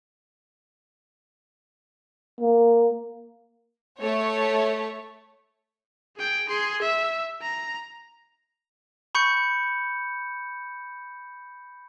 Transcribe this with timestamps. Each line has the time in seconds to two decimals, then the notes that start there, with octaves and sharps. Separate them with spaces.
2.41 A#3
3.98 A3 C#5
6.17 G#4 G5
6.48 G#4 C6
6.81 E5
7.42 A#5
9.15 B5 C#6 G6 C#7